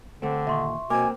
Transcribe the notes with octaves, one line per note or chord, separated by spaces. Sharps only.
D3 A3 C4
D#2 A#2 E5 C6 C#6
B2 A#3 C4 G#5 D6